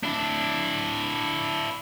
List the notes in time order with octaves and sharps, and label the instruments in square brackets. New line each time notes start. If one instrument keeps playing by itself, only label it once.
[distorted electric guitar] D4 E4